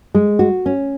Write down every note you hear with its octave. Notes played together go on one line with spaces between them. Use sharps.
G#3
F#4
C#4